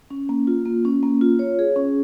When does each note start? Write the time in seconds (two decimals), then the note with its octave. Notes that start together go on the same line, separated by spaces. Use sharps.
0.10 C#4
0.29 A#3
0.47 F4
0.65 A#3
0.85 C#4
1.03 A#3
1.21 F4
1.39 C#5
1.59 G#4
1.76 C#4